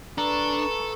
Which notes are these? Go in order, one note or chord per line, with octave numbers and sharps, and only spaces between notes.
D4 A4 B4 A#5 C#6